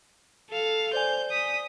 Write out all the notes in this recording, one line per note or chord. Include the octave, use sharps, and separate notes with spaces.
A4 F5
C5 D5 G#5 G6
D#6 B6